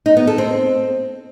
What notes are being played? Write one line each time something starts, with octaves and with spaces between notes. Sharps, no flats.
D#4
B3
A4
C4